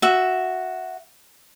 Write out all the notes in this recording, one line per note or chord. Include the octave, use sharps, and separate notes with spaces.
F#4 E5